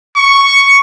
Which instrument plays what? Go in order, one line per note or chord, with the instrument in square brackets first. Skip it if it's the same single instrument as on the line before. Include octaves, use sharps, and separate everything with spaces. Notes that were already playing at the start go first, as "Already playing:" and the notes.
[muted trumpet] C#6